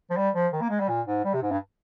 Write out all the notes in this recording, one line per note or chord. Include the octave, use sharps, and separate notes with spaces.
F3
G3
F3
D#3
A#3
G#3
G3
A#2
G#2
G3
C3
G#2
G2